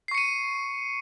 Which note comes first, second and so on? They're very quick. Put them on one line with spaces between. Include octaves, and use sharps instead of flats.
C7 C#6 C#7 D#7